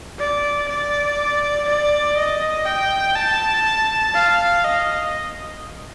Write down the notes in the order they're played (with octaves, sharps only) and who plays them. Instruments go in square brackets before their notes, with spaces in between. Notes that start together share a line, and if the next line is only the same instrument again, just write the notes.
[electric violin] D5
D5
D5
D#5
G5
A5
F5
D#5